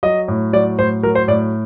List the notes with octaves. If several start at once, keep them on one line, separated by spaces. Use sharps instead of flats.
F#3 D#5
A2
F#3 D5
A2 C5
F#3 A#4
C5
A2 D5